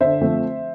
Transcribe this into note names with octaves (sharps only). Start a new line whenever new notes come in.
D3 C5 E5
F3 A3 C4